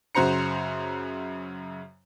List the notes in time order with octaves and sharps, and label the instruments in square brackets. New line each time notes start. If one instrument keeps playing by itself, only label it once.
[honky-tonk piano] F#2 C#3 F#4 C5 A#5 C#7